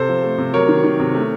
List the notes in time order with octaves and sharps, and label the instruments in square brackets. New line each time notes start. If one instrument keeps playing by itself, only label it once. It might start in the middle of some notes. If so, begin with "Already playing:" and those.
Already playing: [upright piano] C3 A4 C5
F3
A3
C3
F#3 A#4 C#5
D#3
D#3
C3
A3